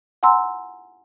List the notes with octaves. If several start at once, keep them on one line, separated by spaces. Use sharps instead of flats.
F#5 G#5 A#5 C6 E6